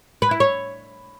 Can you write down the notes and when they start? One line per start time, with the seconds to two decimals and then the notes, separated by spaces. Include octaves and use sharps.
0.22 B4
0.31 E4
0.40 C#5